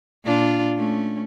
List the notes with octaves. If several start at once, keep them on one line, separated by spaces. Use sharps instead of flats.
A#2 D4 F4
A3 C#4